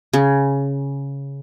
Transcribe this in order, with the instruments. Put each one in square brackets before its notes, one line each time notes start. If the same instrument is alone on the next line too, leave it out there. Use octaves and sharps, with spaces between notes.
[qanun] C#3